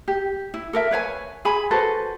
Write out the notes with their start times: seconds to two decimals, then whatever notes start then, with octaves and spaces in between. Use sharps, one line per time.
0.08 G4
0.54 E4
0.73 A4 A#4 E5
0.91 B4 C#5 F5 G#5
1.45 G#4 G#5 B5
1.71 F#4 A4 B4 C5